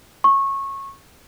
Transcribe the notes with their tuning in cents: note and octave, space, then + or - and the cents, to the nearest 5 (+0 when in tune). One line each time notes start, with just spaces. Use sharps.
C#6 -20